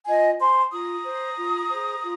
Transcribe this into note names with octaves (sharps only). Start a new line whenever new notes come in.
F4 D#5 G#5
C5 G#5 C6
F4 A#5 D#6
C5
F4
G#4 C5
F4